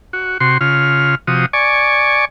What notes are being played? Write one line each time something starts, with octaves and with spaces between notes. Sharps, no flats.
F#4
C3 F#4 C6
C#3 F4 F6
C3 F3 F#4 D#6
D5 G#5 C#6